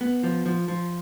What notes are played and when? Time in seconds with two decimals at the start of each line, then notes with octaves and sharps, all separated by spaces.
0.01 B3
0.23 F3
0.46 F3
0.68 F3